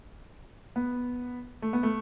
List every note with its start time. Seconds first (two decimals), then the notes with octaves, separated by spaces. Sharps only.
0.76 B3
1.62 A3
1.73 B3
1.83 A3